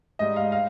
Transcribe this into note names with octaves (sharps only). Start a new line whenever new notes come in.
G#2 G3 D#5
F5
F5